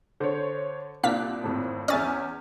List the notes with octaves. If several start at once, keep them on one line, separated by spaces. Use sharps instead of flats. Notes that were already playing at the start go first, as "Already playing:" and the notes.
D3 C5 C#5
C2 A#2 D4 F5 F#6 B6
G#1 F2 A2
E2 C#4 C#5 D5 E5 G#5 F6 A6